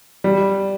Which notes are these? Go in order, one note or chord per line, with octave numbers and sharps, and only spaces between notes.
G3